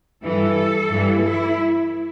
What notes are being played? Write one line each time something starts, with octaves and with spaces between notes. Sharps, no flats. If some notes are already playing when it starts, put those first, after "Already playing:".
G2 E3 A4
G2 E3
E4